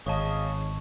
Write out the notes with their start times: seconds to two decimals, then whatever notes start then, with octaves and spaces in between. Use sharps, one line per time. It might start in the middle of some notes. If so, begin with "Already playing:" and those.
0.06 G#1 C#3 D#5 A5 C#6